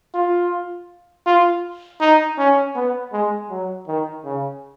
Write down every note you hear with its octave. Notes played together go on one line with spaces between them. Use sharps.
F4
F4
D#4
C#4
B3
G#3
F#3
D#3
C#3